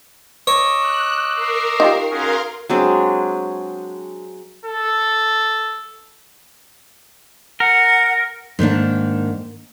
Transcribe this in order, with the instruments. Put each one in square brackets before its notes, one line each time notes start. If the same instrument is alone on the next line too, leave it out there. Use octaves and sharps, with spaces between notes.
[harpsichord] C#5 [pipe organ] D#5 D6 E6
[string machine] F#6
A#4 C7
[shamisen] D#4 F4 G4
[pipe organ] C#4 F#4 G#4 [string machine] A#4 F5 C6
[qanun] F#3 G#3 C4 D4
[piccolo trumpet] A4
[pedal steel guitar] A#4 [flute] F#5
[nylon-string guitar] G#2 D#3 A#3 D4